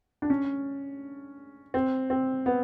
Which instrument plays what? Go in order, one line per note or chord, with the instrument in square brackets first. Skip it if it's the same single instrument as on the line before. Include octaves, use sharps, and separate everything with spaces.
[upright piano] D4
C#4
C4
C4
B3